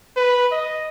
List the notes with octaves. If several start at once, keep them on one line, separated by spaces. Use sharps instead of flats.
B4
D#5